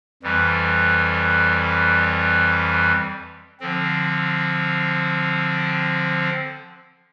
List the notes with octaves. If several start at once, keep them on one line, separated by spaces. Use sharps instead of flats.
F2 E3 G3
D3 F3 C4